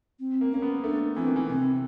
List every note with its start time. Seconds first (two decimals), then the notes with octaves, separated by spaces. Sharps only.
0.19 C4
0.41 A#3
0.51 A#3 C#4
0.62 B3
0.83 A3 D4
1.16 E3 C4
1.26 D#3
1.36 E3
1.49 C3 C4